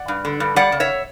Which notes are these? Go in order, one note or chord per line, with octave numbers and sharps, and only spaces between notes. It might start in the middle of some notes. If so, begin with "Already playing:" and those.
Already playing: D5 F#5
G2
D3
G2
G3 D5 F#5
C#3
C#5 E5